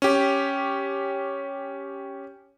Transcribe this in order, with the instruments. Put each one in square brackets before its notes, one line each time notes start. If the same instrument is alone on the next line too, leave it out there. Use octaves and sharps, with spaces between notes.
[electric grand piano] C#4 G4